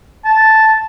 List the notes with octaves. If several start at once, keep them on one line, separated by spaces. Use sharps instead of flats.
A5